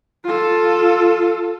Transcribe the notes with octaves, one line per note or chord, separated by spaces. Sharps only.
F4 A4